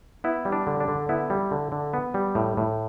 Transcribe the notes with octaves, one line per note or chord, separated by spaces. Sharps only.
B3 E4
G3
D4
D3
D4
D3
B3 E4
G3
D3
D3
B3
G3
A2
A2